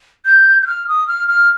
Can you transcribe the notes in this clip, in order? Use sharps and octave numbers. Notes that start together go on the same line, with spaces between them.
G6
G6
F6
D#6
F6
F6